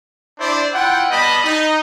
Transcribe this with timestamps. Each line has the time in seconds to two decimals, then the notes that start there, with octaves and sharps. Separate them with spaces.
0.40 D4 E4 C5 D5
0.74 E4 F4 F#5 G5
1.10 G3 B3 D#5 A5 B5
1.44 D#4